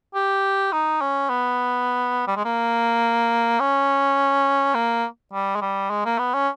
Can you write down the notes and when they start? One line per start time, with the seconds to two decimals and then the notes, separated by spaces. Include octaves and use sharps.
0.14 G4
0.72 D#4
1.01 C#4
1.29 B3
2.28 G3
2.36 G#3
2.45 A#3
3.60 C#4
4.75 A#3
5.33 G3
5.56 G#3
5.62 G3
5.90 G#3
6.05 A#3
6.19 B3
6.34 C#4